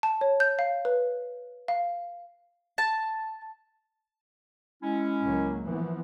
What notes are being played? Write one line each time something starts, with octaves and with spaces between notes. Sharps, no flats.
A5
C#5
G6
F5
B4
F5
A5
G#3 C#4 E4
C#2 F#3 A#3
E3 F3 B3